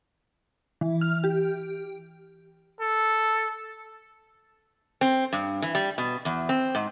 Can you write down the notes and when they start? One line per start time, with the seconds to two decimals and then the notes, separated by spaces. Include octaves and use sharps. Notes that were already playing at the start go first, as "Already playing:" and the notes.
0.81 E3
1.01 F6
1.24 G4
2.81 A4
5.01 C4
5.33 G2
5.62 E3
5.75 G3
5.98 B2
6.25 E2
6.49 C4
6.75 G#2